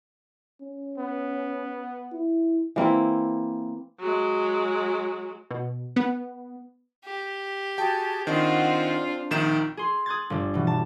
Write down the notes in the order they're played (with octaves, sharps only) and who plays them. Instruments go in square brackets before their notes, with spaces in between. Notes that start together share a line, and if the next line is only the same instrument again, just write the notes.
[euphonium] C#4
[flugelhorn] B3
[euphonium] E4
[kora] E3 A#3 C4 E4
[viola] F#3 G#3
[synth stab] B2
B3
[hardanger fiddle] G4
[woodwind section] F#4 G#4 [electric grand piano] G5 [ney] A5
[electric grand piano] D#3 [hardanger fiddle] C4 F4 [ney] D4 [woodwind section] D#5 F#5
[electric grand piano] A#1 D#3 E7 [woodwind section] D#4 G5
[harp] G#4 C6
D#6 F#6 G#6 A6
G1 D3
B2 E3
A5